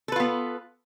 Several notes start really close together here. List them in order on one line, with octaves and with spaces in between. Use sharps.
A4 B4 F4 B3